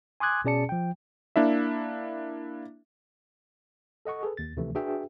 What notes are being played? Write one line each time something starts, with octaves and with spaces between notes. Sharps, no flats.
G#5 C6 D6 D#6 F#6 G#6
B2 C#4 G#4 D5 A5 C#7
F3 G5
A#3 D4 E4 E5
A4 D#5 F#5 C#6
G#4 A4 B4
D#2 A6
D2 C3 E3 F3 A3
D4 F#4 G#4 B4 E5 G5